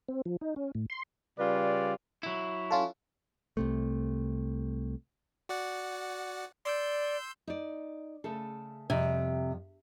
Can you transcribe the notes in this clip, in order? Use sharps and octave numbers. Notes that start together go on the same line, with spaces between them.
C4
F3
D#4
C#4
A2
C6
C#3 G3 F4 B4 D5
F#3 E4
C#4 F4 A4
C2 C3 A3
F#4 D5 F#5
D5 C6 E6 G6
D#4 D5
C#3 A3 A4
F2 C3 G3